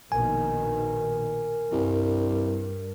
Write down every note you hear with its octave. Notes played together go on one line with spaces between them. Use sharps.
A#1 B2 D#3 A#4 G#5
C2 G2